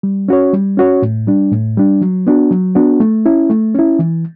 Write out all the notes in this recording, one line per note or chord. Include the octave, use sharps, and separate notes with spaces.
G3
C#4 F#4 C#5
G3
C#4 F#4 C#5
A2
G3 D4
A2
G3 D4
F#3
B3 D4 F#4
F#3
B3 D4 F#4
A3
C#4 E4
A3
C#4 E4
E3